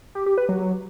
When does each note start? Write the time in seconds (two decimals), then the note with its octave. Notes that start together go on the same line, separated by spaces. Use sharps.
0.15 G4
0.26 G4
0.38 B4
0.49 F#3